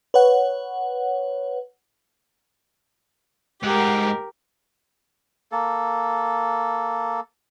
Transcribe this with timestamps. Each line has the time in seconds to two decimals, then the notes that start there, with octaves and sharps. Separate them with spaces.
0.14 B4 C#5 F#5
3.63 G#2 G4 A#4 F#5
5.52 A#3 A4